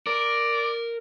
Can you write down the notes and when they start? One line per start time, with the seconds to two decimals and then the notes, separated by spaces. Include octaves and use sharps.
0.07 A#4 D5